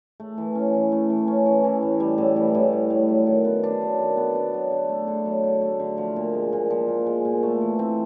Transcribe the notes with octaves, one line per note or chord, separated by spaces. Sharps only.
A3
E3
C#4
E3
A3
E3
C#4
E3
E3
A2
G3
A2
E3
A2
G3
A2
F#3
D#3
B3
D4
F#3
D#3
B3
D4
F#3
D3
A3
D3
F#3
D3
A3
D3
F3
A#2
G#3
A#2
F3
A#2
G#3
A#2
A3
E3
C4